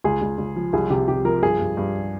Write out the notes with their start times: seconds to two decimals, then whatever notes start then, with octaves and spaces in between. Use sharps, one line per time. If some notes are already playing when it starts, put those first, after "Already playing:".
0.04 C#2 G#4
0.21 C#2
0.38 C#2
0.56 F3
0.73 C2 G#4
0.90 C3 G4
1.08 C2 G4
1.25 F3 A#4
1.42 G2 G#4
1.60 G2
1.77 G2